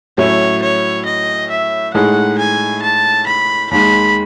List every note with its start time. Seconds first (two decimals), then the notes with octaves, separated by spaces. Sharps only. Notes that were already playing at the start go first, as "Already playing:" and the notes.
0.18 A2 F#3 C#4 E4 C#5
0.62 C#5
1.05 D#5
1.51 E5
1.94 A2 G#3 D#4 G#4 F#5
2.38 G#5
2.82 A5
3.27 B5
3.71 D#2 D#3 G#3 B5